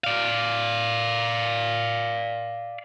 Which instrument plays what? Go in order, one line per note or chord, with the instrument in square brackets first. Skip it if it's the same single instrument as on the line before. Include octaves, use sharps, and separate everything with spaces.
[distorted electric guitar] D5 F5